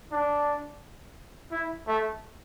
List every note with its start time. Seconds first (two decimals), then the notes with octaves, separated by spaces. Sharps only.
0.12 D4
1.52 E4
1.87 A3